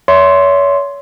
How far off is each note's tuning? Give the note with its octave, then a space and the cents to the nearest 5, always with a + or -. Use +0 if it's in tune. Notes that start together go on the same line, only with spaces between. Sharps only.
C#5 +30 E5 +0 C6 +0